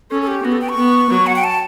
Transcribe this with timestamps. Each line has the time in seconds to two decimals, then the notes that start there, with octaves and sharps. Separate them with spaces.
0.10 C#4 A4
0.22 A4
0.27 G4
0.44 B3 F#4
0.52 A4
0.61 G5
0.70 C#6
0.78 B3
1.10 F#3
1.27 F#5
1.36 G5
1.44 A5